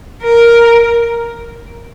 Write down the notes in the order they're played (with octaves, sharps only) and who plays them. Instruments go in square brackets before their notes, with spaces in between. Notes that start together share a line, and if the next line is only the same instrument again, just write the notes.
[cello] A#4